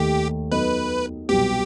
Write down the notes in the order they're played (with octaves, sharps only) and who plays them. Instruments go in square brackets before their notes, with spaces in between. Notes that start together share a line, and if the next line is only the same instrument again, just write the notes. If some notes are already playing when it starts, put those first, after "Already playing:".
Already playing: [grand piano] D#2 D#3 A3 [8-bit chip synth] G4
[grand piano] F#3 B3 D#4 A4 D#5 [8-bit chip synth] B4
[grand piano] C2 B2 F#3 B3 [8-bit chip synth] G4